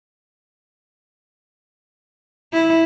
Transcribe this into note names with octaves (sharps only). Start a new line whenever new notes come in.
E4